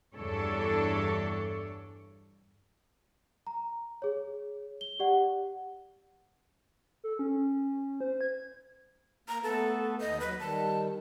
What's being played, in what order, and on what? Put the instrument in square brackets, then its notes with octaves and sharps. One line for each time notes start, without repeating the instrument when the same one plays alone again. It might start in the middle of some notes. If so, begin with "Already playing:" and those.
[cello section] E2 G2 D4 A4 C#5
[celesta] A#5
G#4 C#5
G7
G4 D5 F#5
[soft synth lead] A4
C#4
C5
G#6
[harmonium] A#3 [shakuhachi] A#5
[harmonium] A3 B3 B4 [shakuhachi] A4
[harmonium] D#2 [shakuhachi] D#5
[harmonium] F#3 [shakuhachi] B4
[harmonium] D#3 G3 [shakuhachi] A5